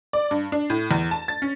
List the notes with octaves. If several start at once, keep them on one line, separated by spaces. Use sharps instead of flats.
D5
G2
D4
A2
E2
A5
A6
C#4